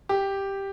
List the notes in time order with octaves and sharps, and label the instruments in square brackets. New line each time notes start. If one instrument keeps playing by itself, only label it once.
[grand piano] G4